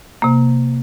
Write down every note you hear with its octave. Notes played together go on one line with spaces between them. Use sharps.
C3 A#3